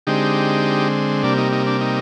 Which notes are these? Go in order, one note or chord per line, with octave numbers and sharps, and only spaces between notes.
D3 G#3 C4 D#4 G4
C3 G3 A#3 D4
D#4
D#4
D4
D#4